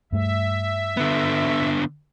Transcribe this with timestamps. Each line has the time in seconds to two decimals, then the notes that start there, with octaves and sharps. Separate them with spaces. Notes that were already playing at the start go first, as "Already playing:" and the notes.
0.12 G2 A3 E5
0.97 D3 B3